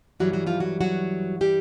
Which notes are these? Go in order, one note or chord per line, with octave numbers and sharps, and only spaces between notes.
G2 E3 F#3 G3 F#4
F#3 F#4
F3 F4
F#3 F#4
F#3 F#4
G3 G4